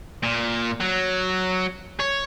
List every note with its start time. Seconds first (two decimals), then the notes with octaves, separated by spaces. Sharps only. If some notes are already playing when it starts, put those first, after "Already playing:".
0.23 A#2
0.81 F#3
2.00 C#5